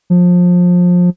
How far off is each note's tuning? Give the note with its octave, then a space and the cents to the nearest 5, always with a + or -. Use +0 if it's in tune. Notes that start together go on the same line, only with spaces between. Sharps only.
F3 +25